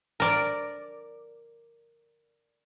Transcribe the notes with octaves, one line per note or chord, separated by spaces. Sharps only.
A#4 D5